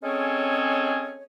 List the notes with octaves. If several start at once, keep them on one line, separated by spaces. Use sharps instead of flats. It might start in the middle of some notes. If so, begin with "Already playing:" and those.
G#3 C4 C#4 G#4 A4 C#5